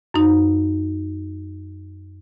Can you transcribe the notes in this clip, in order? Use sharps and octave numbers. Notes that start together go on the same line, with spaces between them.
F#2 D#4